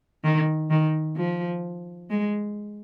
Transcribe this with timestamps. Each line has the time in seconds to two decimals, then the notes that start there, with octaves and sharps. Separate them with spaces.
0.24 D#3
0.70 D#3
1.17 F3
2.10 G#3